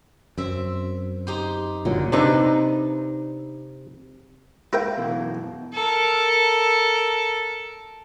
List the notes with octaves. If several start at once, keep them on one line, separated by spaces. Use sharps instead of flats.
F#2 C4 E5
D#4 G4 C5
F#1 A#2 D3 F#3
C3 D4 D#4 B4
E4 A#4 F5 G5
F#2 B2 E3
A4 A#4